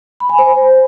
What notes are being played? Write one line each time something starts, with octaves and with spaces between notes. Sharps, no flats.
B5
G#5
C5